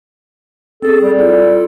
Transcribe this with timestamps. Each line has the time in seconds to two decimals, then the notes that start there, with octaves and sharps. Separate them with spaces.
0.82 C4 G#4 A4
1.02 G3
1.19 E4 F4 A4